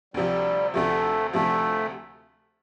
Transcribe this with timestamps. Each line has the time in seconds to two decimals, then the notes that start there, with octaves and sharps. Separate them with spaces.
0.14 D2 C3 F3 G3
0.73 D2 C3 F3 A3
1.33 D2 C3 F3 A3